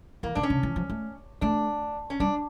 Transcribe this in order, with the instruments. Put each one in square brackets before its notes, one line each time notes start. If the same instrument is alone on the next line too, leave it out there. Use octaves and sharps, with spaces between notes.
[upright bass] E3 [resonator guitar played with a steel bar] A#3
[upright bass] D3 [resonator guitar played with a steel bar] D4
[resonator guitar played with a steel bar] C#4
[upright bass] C#3
E3
F3
A3
[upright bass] A3 [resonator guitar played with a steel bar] D4
[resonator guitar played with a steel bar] C#4
[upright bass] G3 [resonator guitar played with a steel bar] D4